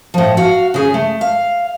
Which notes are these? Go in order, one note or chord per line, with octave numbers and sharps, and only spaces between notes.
A2 F3
F#4 F5
C#3 G#4
A3
F5